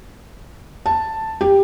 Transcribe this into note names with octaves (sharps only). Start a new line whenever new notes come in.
A5
G4